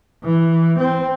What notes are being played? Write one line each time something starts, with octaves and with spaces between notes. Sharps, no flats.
E3
C4